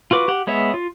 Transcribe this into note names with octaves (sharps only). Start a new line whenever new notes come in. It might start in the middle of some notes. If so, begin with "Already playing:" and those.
F4 F#4 B4 D6
G4 F#5
G#3 B3 C#5 E5
F4